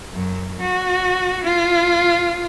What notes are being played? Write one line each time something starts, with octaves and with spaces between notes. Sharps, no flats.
F#2
F#4
F4